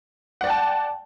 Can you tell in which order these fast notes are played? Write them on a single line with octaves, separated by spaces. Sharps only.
F#5 D5 G5 A5